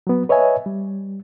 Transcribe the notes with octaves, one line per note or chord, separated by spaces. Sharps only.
F#3 B3
B4 C#5 D#5 E5 G#5
G3